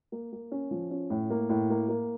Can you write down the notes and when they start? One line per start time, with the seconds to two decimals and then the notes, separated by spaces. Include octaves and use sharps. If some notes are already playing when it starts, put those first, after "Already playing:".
0.12 A#3
0.33 A#3
0.52 C#4
0.71 F3
0.91 C#4
1.10 A2
1.30 A#3
1.49 A2
1.70 A#3
1.89 A#3